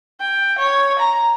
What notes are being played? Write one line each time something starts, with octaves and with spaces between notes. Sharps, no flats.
G5
C#5
A#5